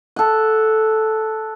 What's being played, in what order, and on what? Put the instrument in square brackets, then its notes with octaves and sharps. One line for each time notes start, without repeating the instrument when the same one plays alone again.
[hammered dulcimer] A4 F#5